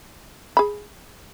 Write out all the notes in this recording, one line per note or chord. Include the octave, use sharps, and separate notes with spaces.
G#4 B5